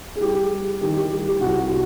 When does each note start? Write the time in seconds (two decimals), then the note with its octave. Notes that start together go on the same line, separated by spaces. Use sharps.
0.16 G#4
0.21 G3 G4
0.51 G3
0.81 D#3 G4
0.96 G4
1.11 G3 G4
1.27 G4
1.41 C2 F#4
1.68 F#4